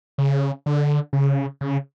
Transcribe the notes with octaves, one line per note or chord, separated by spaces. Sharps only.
C#3
D3
C#3
C#3